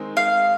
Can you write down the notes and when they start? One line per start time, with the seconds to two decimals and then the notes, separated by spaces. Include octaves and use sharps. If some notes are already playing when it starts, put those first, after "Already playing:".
Already playing: D#3 G#3 C4 D#4
0.17 F5